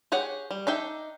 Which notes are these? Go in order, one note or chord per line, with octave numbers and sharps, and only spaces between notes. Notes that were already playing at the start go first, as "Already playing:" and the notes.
G4 G#4 C#5 F#5
G3
D4 D#4 E5 G5